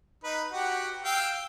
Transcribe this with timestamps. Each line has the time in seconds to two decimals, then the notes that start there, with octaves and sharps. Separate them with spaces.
0.24 D#4 B4
0.52 F#4 G4 F#5
1.04 F5 G5 E6